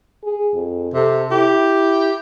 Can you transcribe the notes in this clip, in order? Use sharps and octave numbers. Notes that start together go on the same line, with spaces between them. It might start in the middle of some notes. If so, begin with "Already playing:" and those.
G#4
F2
C3 A4
E4 G4